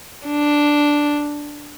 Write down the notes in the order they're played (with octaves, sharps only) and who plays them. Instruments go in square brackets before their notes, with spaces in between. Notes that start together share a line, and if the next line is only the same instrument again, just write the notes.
[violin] D4